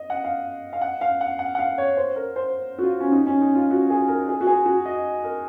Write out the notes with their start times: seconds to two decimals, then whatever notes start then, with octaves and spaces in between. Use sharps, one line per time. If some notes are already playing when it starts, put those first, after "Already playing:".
Already playing: D#5
0.10 F#5
0.24 F5
0.73 F5
0.81 F#5
1.01 F5
1.21 F#5
1.39 F#5
1.55 F#5
1.59 F5
1.78 C#5
1.97 C5
2.16 A#4
2.36 C5
2.78 F#4
2.83 F4
3.00 C#4
3.12 D#4
3.27 C#4
3.41 D#4
3.55 F4
3.71 F#4
3.90 G#4
4.08 A#4
4.28 G#4
4.41 F#4
4.47 G#4
4.66 F#4
4.85 D#5
5.24 A#4